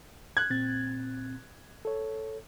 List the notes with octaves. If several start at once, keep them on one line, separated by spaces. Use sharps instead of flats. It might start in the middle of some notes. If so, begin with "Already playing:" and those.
F#6 G#6
A#2 C4 A6
A4 C#5